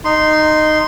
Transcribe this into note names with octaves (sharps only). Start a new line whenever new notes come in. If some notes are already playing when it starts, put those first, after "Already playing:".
D#4 C6